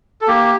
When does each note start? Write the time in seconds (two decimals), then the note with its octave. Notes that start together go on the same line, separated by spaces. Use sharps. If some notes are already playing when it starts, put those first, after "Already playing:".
0.21 A4
0.27 A#3 G4